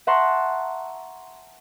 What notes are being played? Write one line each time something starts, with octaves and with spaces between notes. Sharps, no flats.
E5 F#5 A5 A#5 C6 C#6